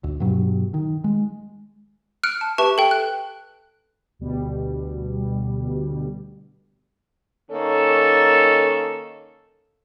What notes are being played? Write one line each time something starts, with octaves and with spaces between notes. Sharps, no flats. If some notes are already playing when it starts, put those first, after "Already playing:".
D2
G2 B2 F#3
D#3
G#3
F6 F#6 C#7 D7
A5
G4 B4 E5 A5 C#6 E7
A4 G5
F#6
D2 B2 G3
D#3 A#3 C#4 A4